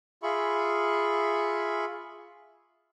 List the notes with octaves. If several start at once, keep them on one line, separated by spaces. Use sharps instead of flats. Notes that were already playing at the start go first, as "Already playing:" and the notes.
F4 G#4 E5 B5 C#6